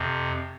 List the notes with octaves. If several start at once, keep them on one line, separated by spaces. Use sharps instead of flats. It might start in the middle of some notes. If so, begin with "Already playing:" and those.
Already playing: F2 C3